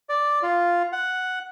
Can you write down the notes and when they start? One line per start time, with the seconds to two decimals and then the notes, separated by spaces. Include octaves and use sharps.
0.09 D5
0.43 F4
0.92 F#5